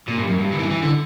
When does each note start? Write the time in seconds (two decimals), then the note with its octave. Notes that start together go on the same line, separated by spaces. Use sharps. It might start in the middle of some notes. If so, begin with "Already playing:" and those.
0.08 A#2
0.18 G2
0.28 F#2
0.39 G2
0.53 D3
0.60 E3
0.71 E3
0.83 D3